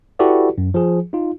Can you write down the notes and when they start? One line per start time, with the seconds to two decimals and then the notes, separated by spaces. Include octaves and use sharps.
0.19 E4 F#4 G4 A4 B4 D5
0.58 F#2
0.74 F3 G#4
1.13 D#4 F4